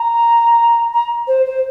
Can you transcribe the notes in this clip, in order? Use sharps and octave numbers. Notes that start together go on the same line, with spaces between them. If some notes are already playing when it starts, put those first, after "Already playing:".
Already playing: A#5
A#5
C5
C5